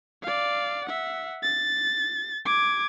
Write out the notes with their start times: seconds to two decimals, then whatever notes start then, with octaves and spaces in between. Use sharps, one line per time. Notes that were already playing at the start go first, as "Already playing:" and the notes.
0.23 D5 F5
0.85 E5 F#5
1.43 A6
2.46 D6 G#6